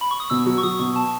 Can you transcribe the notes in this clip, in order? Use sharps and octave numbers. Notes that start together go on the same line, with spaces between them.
B5
C#6
D#6
B2 E6
F#3
C#6
F#3 D#6
B2 C#6
A5